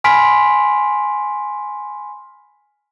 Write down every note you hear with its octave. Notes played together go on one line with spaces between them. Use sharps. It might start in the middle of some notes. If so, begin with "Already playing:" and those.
G#5 B5 C6 F6 B6 D7